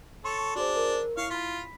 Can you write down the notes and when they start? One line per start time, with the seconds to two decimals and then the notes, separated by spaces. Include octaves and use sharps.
0.24 A4 C#5 C6
0.56 D4 F#4 G#4 C5
0.76 A#4
1.17 E4 C#5 F5 C#6
1.30 F4 B5 B6